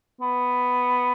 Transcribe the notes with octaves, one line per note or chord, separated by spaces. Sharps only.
B3